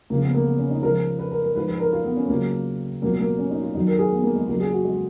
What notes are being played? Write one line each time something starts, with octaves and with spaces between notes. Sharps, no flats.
C#2 C#3 F3 A#3
B3
A#3
B3
C#4
D#4
C#2 C#3 F3 A#4
B4
A#4
A#4
G#2 F3 B4
B4
A#4
F4
B3
C#4
C#2 C#3 F#3 A#3
C#2 B2 F#3 A#3
A#3
C#4
D#4
F4
F#2 D#3 F#3 D#4
A#4
G#4
B3
A#3
G#3
C#2 C#3 F#3 A#3
G#4
F#4
G#3